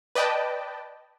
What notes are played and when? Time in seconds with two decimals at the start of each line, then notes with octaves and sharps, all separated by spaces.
0.15 B4 D5 D#5 G5 A5